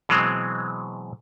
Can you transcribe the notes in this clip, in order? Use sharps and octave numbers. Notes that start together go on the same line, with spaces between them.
B2 E3 F#3 G#3 C4